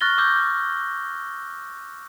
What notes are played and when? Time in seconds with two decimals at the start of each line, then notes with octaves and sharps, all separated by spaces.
0.01 C#6 F6 F#6 A6 A#6 G7
0.18 D6 E6 G6